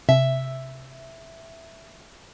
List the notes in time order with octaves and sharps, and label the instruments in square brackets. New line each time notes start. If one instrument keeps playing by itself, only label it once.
[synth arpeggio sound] C3 [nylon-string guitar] E5